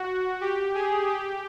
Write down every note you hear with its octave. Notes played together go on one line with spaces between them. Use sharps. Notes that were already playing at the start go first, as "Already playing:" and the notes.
Already playing: F#4
G4
G#4
G4